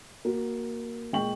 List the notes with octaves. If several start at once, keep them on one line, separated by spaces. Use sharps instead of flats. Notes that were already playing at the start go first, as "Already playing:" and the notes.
A#3 F#4
A#2 G#3 G5 C#6 F#7